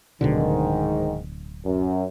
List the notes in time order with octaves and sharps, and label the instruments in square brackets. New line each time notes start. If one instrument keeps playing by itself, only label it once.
[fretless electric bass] D1 B2 D3 [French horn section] G#2 D#3
[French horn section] F#2